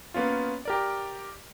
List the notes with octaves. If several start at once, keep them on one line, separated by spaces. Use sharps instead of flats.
A#3 B3 C#4 F4
G4 A#4 D5